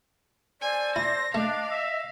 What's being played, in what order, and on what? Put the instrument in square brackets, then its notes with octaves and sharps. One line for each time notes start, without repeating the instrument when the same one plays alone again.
[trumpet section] A4 C5 [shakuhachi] D5 [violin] G#5
[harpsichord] E4 [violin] A#6
[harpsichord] A3 [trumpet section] D4 [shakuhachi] D#5 [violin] F5
[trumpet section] E5